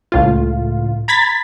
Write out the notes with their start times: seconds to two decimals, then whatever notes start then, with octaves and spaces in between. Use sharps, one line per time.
0.12 C#2 A2 F4
1.08 A#5 B5 G#6 A6 B6